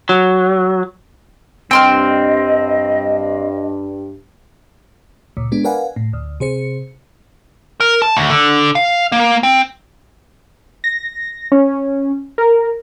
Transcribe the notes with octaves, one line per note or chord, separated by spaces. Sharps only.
F#3
G2 C4 D#5 G5 C6 F6
C#2 A#2
G#3 B3 D4
A#4 B4 D5 F5 F#5 G#5
A2
D2
C3 G#4 C5 C#7
A#4
A5
D2
D3
F5
A#3
C4
A#6
C#4
A#4